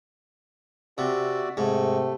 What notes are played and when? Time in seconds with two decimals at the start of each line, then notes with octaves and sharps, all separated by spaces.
0.98 C3 F#4 D5 E5
1.57 G#2 C3 A3